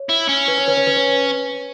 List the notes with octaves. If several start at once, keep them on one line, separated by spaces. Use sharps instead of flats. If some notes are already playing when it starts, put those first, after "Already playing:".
Already playing: C#5
E4
C#4
B4
C#5
B4
C#5
B4
C#5